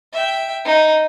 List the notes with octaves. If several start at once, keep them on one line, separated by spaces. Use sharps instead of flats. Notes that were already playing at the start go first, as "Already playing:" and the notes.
E5 G5
D#4